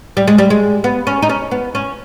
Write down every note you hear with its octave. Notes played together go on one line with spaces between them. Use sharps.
G3
G#3
G3
G#3
B3
C#4
D#4
C#4
B3
C#4